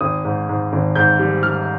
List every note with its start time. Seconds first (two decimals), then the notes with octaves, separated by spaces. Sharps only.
0.01 G#1 D#6
0.25 G#2
0.49 G#2
0.73 G#1
0.96 G#2 G6
1.19 G3
1.43 G3 F6